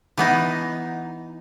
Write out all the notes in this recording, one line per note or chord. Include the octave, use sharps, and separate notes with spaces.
E3 B3 D#4